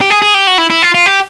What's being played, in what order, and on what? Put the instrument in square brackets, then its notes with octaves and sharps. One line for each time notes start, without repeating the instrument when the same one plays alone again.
[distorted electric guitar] G4
G#4
G#4
G4
F#4
E4
E4
F4
F4
G4